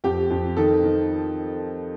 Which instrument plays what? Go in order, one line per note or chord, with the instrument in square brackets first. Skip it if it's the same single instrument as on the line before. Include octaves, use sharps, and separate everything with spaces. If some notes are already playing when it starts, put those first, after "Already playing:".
[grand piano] F2 G4
F2
D#3 A4
D#3